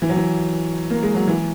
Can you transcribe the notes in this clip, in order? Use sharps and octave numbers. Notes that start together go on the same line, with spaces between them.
E3
F#3
E3
A#3
G#3
F#3
E3